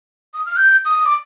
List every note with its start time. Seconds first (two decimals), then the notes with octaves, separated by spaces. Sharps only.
0.34 D#6
0.46 F6
0.57 G6
0.85 D#6
1.06 D6